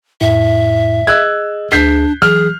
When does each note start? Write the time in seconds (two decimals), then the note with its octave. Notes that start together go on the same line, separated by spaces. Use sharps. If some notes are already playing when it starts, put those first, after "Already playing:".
0.21 F2 A2 E4 E5
1.07 G#4 D#5 E6 F#6 G#6
1.72 D2 D4 G#4 G6 B6 C7
2.22 E3 F#3 G#4 F6